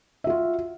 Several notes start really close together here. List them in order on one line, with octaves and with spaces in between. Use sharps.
E5 F#4 F4